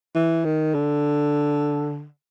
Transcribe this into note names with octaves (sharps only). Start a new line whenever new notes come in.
E3
D#3
D3